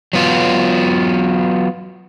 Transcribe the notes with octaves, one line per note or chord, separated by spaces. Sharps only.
F#3 B3 F4